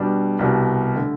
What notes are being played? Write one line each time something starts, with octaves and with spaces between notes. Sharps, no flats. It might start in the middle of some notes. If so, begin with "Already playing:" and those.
Already playing: B2 G3 D4
C2 B2 G3
D3 A3